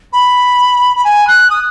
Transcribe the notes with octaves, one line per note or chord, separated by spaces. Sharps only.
B5
B5
G#5
F#6
D#6